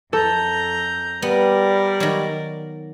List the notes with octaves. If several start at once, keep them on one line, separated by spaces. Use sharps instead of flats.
F2 A4 A#5 G6
G3 B3 A#4 D5
D#3 F#3